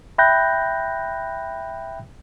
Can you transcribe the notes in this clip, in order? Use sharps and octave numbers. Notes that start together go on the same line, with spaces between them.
E5 G5 B5 F#6 G6 A#6